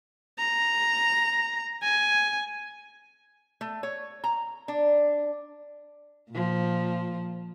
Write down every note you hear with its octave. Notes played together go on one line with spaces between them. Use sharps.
A#5
G#5
A3
C#5
A#5
D4
A#2 F3